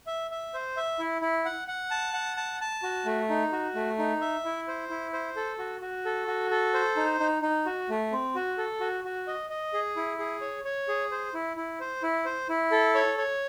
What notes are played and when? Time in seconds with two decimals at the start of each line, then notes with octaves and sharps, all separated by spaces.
0.07 E5
0.31 E5
0.54 C5
0.77 E5
0.99 E4
1.22 E4
1.45 F#5
1.68 F#5
1.91 A5
2.14 F#5
2.37 A5
2.61 A5
2.83 F#4
3.06 A3
3.30 D#4
3.52 F#4
3.75 A3
3.99 D#4
4.21 E5
4.45 E4
4.68 C5
4.90 E4
5.13 C5
5.36 A4
5.59 F#4
5.82 F#4
6.05 A4
6.27 F#4
6.51 A4
6.74 C5
6.96 D#4
7.20 D#4
7.42 D#4
7.66 F#4
7.90 A3
8.12 C4
8.35 F#4
8.58 A4
8.80 F#4
9.04 F#4
9.27 D#5
9.50 D#5
9.73 G#4
9.96 E4
10.19 G#4
10.41 C#5
10.65 C#5
10.88 G#4
11.11 C5
11.34 E4
11.57 E4
11.80 C5
12.03 E4
12.25 C5
12.49 E4
12.71 A4
12.95 C#5
13.18 C#5